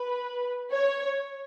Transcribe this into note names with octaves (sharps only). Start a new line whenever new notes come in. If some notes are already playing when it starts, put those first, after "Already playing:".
Already playing: B4
C#5